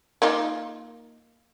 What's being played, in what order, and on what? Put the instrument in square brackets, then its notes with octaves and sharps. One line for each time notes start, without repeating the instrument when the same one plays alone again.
[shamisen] A#3 D#4 F4